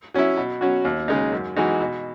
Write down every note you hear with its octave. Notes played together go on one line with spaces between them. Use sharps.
F#3 C#4 E4
B2
F#3 C#4 F#4
D#2
C#3 G#3 D#4
F#2
E3 G#3 D#4 F#4
B2